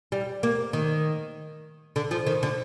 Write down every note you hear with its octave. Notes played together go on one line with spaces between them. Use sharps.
G3
A#3
D#3
D3
F3
D#3
D3